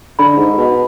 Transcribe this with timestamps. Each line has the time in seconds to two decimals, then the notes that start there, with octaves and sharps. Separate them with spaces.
0.19 D3 B5
0.37 G#2
0.58 B2